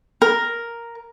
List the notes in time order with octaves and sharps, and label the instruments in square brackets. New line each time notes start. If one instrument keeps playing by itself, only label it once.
[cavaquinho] A#4